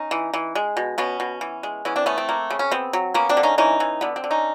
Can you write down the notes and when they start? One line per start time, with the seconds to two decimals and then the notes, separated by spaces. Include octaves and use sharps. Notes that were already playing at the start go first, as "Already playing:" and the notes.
Already playing: C#4 D#4
0.11 E3
0.34 E3
0.55 G#3
0.77 B2
0.98 B2 B3 C#4
1.20 B2
1.41 E3
1.63 G#3
1.85 E3 B3 C#4
1.96 C4 D4
2.06 A3 B3 C#4
2.18 C4
2.29 A#3
2.50 C#3
2.59 C#4
2.71 B3 C4
2.93 F#3
3.14 A#3 B3 C#4
3.29 C4 D4
3.37 D3
3.43 C#4 D#4
3.58 E3 C#4 D#4
3.80 E3
4.01 D3 B3
4.16 C4
4.24 D3
4.31 C#4 D#4